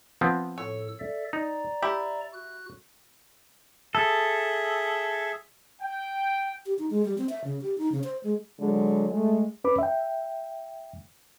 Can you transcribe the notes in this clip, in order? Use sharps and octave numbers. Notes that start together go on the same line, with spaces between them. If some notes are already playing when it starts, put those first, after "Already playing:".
F3 B3 C4
A2 A4 C#5 E6
A4 D5 E5
D#4 D5 A#5
E4 G4
F#4 F#6
G#4 A4 E5
G5
G4
D#4
G#3
G3
C4
E5
C#3
G4
D#4
C#3
C5
G#3
D3 F#3 G#3
G#3 A3
C#4 B4 B5 D6
E5 G5